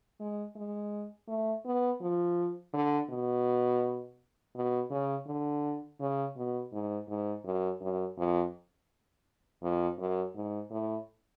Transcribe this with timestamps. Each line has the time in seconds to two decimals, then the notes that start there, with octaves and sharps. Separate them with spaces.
0.20 G#3
0.55 G#3
1.28 A3
1.65 B3
2.01 F3
2.73 D3
3.10 B2
4.55 B2
4.90 C#3
5.27 D3
6.00 C#3
6.36 B2
6.72 G#2
7.08 G#2
7.44 F#2
7.81 F#2
8.17 F2
9.62 F2
9.98 F#2
10.34 G#2
10.70 A2